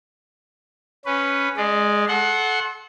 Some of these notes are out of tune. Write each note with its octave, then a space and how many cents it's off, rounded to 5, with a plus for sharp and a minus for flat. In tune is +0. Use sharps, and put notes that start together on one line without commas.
C#4 +0 B4 +0
G#3 +0 D5 +35
A4 -25 F#5 +0 C6 +30